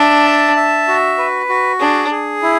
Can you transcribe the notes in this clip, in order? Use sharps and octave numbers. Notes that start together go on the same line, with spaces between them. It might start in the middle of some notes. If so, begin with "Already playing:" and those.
Already playing: D4 E5
A5
E5
F#4
B4
F#4
D4 G#4
G#4
E4